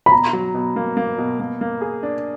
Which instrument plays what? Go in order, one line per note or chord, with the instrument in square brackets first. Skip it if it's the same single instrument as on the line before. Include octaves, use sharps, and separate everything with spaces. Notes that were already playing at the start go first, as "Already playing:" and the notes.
[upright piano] B5
[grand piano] B2 [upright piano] A#5
[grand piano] F#3
B2
A#3
A#3
B2
A#3
A#3
G#4
D4